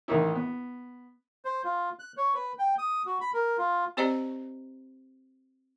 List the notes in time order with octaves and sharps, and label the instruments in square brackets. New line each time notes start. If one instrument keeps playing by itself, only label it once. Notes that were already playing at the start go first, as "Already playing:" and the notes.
[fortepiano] A1 D#3 D#4 E4
B3
[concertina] C5
F4
F#6
C#5
B4
G5
D#6
F#4
B5
A#4
F4
[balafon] C4 G4 C5 D5 D#5 A#5